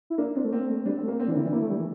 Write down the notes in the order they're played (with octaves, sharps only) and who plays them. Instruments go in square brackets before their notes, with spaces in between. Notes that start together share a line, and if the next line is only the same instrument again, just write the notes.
[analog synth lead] E4
[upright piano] A#3 [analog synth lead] D4
[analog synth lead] C4 [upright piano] D4
[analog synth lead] A3
[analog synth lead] A#3 [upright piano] C4
[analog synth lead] A3
[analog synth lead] G3 [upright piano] D4
[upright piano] C4
[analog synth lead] A3
[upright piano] A#3
[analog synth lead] A#3 [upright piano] C4
[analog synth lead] E3 [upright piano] D4
[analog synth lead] D3 [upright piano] E4
[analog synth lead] E3 [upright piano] D4
[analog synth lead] A#3 [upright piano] E4
[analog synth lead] A3
G3
E3